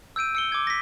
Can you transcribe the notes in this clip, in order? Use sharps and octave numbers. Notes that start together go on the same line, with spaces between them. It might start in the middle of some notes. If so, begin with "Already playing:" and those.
E6 G6 D7 D#7
E6 C#7 G7
D6 G#6
A#6 B6